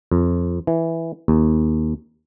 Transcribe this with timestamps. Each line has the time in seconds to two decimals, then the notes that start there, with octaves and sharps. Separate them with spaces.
0.12 F2
0.67 E3
1.28 D#2